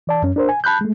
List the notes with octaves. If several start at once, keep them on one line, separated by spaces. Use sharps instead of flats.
E3 D5 A5
F#2 C#4
D4 A#4 C5
G#5
A5 B5 F#6 G6
G#3 A3